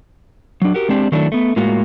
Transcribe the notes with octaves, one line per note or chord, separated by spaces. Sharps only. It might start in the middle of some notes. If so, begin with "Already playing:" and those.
F#3 D4
F#4 G4 A#4
G#3 C4 D4 G4
D#3 F#3 A3 D4 E4
A3 B3
A2 G#3 A#3 F4 F#4